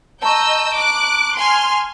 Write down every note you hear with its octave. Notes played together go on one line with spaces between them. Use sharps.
D#5 A5 A#5 C#6 E6 G6
D6 F#6
G#5 C6 F6